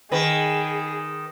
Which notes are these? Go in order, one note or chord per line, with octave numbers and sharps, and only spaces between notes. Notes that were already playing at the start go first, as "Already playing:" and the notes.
D#3 G#4 B4